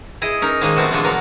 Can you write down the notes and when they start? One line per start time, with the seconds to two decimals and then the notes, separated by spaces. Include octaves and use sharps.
0.22 E4 G#4 D#5
0.42 C#4 D#4 A#4
0.61 A2 D#3 F3 G#3 A#3
0.76 G3 A3 B3 C4 E4 F#4
0.91 B2 D3 E3 F3 G#3 A3
1.04 F#3 B3 A#4